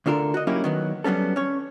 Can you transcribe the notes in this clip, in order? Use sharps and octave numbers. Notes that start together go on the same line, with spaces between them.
D2 D3 F4 A4 A#4
F#4 D#5
F#3 A#3 C#4 D#4 E4 G4
D#3 F#3 B3
F#3 G3 B3 C#4 A4
C#4 C#5